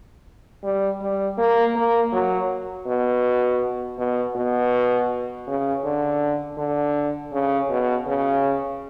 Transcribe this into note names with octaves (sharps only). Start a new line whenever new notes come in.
G3
G3
A#3
A#3
F#3
B2
B2
B2
C#3
D3
D3
C#3
B2
C#3